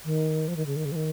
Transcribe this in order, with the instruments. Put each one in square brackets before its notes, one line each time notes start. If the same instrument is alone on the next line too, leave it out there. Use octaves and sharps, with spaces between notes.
[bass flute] D#3
F3
D#3
C#3
D#3
C#3
F3
D#3